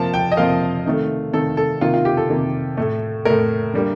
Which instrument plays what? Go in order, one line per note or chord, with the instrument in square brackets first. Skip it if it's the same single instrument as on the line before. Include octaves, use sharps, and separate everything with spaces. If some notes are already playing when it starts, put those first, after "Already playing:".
Already playing: [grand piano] C3 F3 A#3 A5
G5
D#5
C3 F3 A#3 F5
C3 D#3 A3
C3 D#3 A3 A4
A4
C3 D#3 A#3 F4
F4
G4
A4
C3 D#3 A#3
A2 A3
A2 A3 A#4
D3 G3 A#3